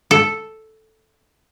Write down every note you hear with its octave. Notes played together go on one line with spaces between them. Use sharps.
A4